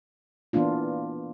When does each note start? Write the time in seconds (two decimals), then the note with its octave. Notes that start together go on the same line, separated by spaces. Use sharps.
0.53 E3 A#3 B3 D4 F4